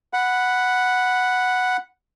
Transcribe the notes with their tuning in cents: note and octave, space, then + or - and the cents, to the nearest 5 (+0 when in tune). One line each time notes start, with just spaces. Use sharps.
F#5 +0 B5 +0